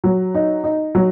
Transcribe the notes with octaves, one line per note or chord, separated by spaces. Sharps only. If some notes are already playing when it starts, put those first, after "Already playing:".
F#3
D#4
D#4
F#3